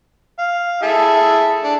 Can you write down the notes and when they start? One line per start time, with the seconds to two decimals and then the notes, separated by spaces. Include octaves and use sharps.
0.39 F5
0.83 E4 G#4 A4
1.64 D4